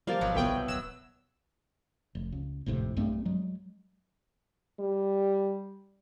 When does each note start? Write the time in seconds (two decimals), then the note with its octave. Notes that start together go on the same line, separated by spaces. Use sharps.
0.07 F3 G3 A#3 F5 A5 D6
0.21 G#1 B2 F#3 D5
0.35 C2 B3 C#5 E5 G5
0.68 D1 F#3 E6
2.15 F1
2.32 C#2
2.66 G#1 F2 A2 C3
2.96 B1 G2 A3 C4
3.25 F#3 G#3
4.79 G3